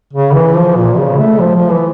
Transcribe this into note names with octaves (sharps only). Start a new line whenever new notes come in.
C#3
E3
F3
A#2
C#3
A3
F3
F3
E3